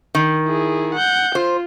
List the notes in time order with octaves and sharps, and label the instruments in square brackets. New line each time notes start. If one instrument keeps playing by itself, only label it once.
[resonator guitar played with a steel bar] D#3
[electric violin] E4 G#4
F#5 G6
[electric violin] F4 [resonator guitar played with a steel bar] C5